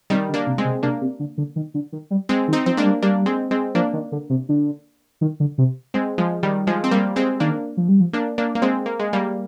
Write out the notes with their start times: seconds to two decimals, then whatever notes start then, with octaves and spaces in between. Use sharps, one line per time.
0.10 C3 D#3 G3
0.28 D3
0.34 A#3 D4
0.47 C3
0.58 G#3 C4
0.65 C3
0.83 C3 A#3 D4
1.01 C3
1.19 D3
1.38 D3
1.56 D#3
1.74 D3
1.92 D#3
2.11 G3
2.29 G#3 C4
2.48 D#3
2.53 C4 D#4
2.66 F3 C4
2.77 G#3 A#3 D4
2.84 G3
3.02 G3 A#3 D4
3.26 G#3 C4
3.51 G#3 C4
3.75 F3 A#3 D4
3.93 D#3
4.12 D3
4.30 C3
4.49 D3
5.21 D#3
5.40 D3
5.58 C3
5.94 G#3 C4
6.18 F3 G#3
6.43 D#3 G3
6.67 F3 G#3
6.84 C4
6.91 G3 A#3
7.16 G#3 C4
7.40 D#3 A#3 D4
7.77 F3
7.89 G3
8.00 F3
8.13 A#3 D4
8.38 A#3 D4
8.55 A#3
8.62 G#3 C4
8.86 A#3
8.99 G#3
9.13 G3 A#3